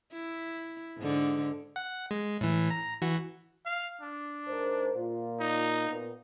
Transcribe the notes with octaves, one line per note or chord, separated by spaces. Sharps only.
E4
G#2 D3
F#5
G#3
A2 E3
A#5
E3 F#4
F5
D4
G#2 A#4 C5
A#2 F4
D#4
A#2 B3